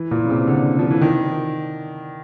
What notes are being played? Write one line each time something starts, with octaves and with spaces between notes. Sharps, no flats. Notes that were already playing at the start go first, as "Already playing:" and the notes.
Already playing: E3
A#2
C#3
C3
D3
F3
E3
D#3